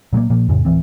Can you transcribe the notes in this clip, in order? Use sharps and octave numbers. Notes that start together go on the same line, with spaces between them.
A#2 F#3 A3 A#3
A#2 F3 A#3
F2 A2 C#3
D1 F2 E3 C4